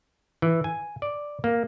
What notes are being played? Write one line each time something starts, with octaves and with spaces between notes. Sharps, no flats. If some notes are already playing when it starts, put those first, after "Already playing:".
E3
G#5
D5
A#3